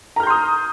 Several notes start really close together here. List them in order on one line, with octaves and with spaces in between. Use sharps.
A#5 F6 G6 C6 D#6